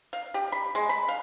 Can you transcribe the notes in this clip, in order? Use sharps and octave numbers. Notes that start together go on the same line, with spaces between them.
F5
G4
B5
G#3
B5
F5